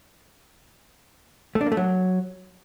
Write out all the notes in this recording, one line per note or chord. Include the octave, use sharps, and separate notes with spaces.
A3
D4
A#3
A3
F#3